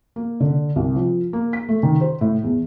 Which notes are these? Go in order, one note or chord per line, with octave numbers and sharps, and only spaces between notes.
A#3
D3
C2
F3
A#3
B6
A3
D#3
C5
A2
E2